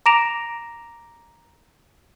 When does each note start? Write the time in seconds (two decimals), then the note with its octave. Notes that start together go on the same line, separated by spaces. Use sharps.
0.06 A#5 D6 A#6 D7 E7 F7